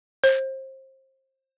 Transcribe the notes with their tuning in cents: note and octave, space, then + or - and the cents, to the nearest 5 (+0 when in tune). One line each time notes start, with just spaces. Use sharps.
C5 +30